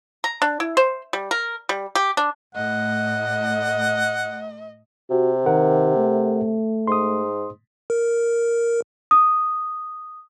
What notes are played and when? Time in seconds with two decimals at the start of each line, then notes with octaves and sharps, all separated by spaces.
0.24 A#5
0.42 D4
0.60 E4
0.77 C5
1.13 G3
1.31 A#4
1.69 G3
1.95 G4
2.17 D4
2.55 A2 D#5 F#5
5.10 C3 F#4
5.46 D#3 G4 A#4 F#5
5.96 A3
6.87 G#2 C6 D#6
7.90 A#4
9.11 D#6